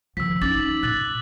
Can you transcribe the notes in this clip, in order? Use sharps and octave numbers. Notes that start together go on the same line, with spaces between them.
D#3 F3 E6 B6
C#4 D#4 D6 A6 F#7
A#2 F#6 A6 F#7